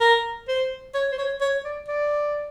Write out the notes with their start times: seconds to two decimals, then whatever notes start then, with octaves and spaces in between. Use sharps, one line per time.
0.01 A#4
0.48 C5
0.94 C#5
1.12 C5
1.18 C#5
1.41 C#5
1.65 D5
1.88 D5